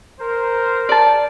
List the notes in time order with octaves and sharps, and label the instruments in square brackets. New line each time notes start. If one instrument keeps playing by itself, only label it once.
[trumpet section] A#4 C5
[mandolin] D5 A5